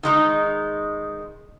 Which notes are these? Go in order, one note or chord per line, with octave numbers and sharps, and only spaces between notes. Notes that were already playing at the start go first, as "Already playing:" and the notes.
D#3 G#3 D#4